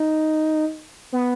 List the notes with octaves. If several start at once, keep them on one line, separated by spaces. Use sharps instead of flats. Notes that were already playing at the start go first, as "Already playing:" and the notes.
Already playing: D#4
B3